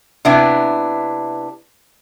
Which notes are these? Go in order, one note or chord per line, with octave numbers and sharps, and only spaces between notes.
C3 B3 D4 E4